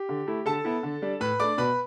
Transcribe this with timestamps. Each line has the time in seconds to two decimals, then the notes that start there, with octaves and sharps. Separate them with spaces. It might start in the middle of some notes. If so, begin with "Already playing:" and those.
Already playing: G4
0.09 D3
0.27 A3 E4
0.46 D3 A4 A5
0.65 B3 E4
0.83 D3
1.02 G3 D4
1.20 A2 B4 B5
1.40 A3 D4 D5 D6
1.58 B2 B4 B5